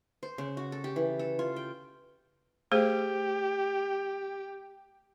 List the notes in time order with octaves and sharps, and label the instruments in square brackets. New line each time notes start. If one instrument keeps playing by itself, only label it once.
[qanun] C5
C#3
F#4
A4
G4
E3
A4
F4
G5
[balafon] A3 G#4 C5 [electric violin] G4